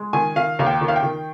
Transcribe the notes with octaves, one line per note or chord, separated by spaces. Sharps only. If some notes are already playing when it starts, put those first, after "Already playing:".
Already playing: G#3
D#3 G#5
D#3 F5
D#2 F5
G5
D#3
F5
G5
D#3